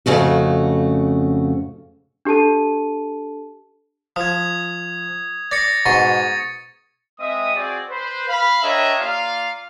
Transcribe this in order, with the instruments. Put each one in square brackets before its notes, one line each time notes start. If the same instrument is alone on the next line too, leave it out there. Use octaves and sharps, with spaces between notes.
[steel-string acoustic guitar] F2 C#3 A3 F#4
[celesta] D4 G4 A4 A5 D#7
[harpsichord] F3 [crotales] D#6 G#6
[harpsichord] D5 [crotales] A6 A#6 C#7
[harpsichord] G#2 B2 C6 [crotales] C#6 A6
[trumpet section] G#3 C4 D#5 E5 D#6
C4 F#4 G#4 D5
B4 C5
F5 B5
D4 G4 A#4 C#5 D#5 E5
A#3 F4 D5 F5